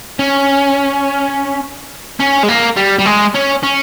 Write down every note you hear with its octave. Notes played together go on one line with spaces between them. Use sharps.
C#4
C#4
G#3
A#3
G3
G3
G#3
C#4
C#4